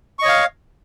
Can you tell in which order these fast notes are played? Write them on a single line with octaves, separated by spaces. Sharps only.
C#6 D#5 C#5 F5